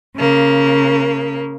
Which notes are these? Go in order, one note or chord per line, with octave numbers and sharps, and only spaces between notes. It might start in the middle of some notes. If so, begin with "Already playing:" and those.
C#3 A#3